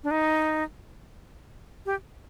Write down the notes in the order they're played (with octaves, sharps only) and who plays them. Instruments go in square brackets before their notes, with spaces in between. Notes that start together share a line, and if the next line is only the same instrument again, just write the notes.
[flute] D4
D#4
G4